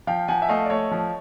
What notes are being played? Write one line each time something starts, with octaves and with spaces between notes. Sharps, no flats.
F3 F5 G5
F3 F#5 G#5
E5
A3 D#5 F5
D5
A3 C#5 D#5
F3